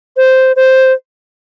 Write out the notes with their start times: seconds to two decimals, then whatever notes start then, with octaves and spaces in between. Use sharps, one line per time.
0.17 C5
0.56 C5